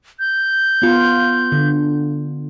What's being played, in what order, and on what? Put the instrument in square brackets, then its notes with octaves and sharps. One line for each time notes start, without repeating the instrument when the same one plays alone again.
[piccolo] G6
[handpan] B3 F4
D3